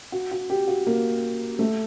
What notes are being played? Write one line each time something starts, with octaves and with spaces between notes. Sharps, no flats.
F#4
F#4
G4
F#4
A#3
A3